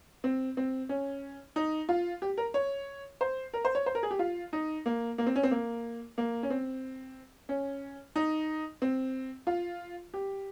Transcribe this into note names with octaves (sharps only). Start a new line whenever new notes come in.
C4
C4
C#4
D#4
F4
G4
A#4
C#5
C5
A#4
C5
C#5
C5
A#4
G#4
G4
F4
D#4
A#3
A#3
C4
C#4
C4
A#3
A#3
C#4
C4
C#4
D#4
C4
F4
G4